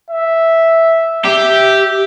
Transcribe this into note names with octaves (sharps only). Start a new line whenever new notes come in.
E5
G4 E5